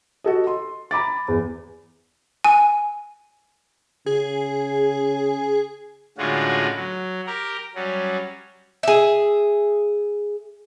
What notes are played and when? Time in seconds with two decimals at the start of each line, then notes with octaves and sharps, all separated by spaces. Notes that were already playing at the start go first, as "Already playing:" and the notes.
0.24 F#4 A4 D#5
0.47 C6
0.91 A#5 B5 D6 A6
1.28 E2
2.44 G#5
4.06 C#3 G#4
6.18 A2 D3 G#3 C#4 F4 F#4
6.75 F#3
7.27 G4 A#4 A#5
7.75 F#3 G3 C#4
8.83 G#4 E5